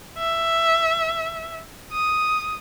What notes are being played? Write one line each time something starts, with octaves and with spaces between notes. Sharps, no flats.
E5
D#6